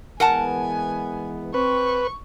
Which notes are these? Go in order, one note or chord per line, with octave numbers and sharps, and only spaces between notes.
E3 G#3 B3 A#4 F#5 G#5 A5
C4 B4 C#6